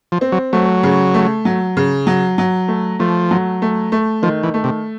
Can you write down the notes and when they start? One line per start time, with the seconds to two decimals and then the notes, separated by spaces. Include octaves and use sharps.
0.12 F3
0.21 C4
0.32 F#3
0.53 F#3 A3
0.83 C#3
1.14 A3
1.45 F#3
1.77 C#3
2.07 F#3
2.38 F#3
2.68 A3
2.99 F3 A3
3.31 F#3
3.62 A3
3.92 A3
4.22 D#3 F3
4.43 E3
4.54 A3
4.64 C3